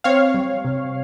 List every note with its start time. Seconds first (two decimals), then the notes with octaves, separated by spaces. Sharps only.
0.04 C4 C#5 F5
0.34 G3
0.64 C3